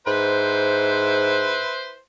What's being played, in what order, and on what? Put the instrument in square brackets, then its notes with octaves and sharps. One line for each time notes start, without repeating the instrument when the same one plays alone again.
[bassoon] G#2 [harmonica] E4 B4 C5